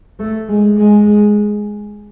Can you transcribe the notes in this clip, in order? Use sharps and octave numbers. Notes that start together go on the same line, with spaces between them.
A3
G#3
G#3